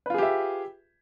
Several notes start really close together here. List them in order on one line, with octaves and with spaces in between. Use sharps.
B4 F4 G#4 G4 E5